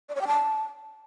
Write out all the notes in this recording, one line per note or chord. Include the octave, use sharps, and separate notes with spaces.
D5
C#5
G5
A5